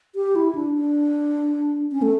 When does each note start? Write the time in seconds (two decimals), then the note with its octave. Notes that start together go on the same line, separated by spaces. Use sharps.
0.15 G4
0.36 E4
0.55 D4
0.74 D4
1.92 C#4
2.02 A3